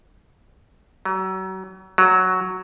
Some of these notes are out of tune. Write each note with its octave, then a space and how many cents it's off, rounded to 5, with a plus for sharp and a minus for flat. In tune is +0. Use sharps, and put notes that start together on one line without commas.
F#3 +35
F#3 +0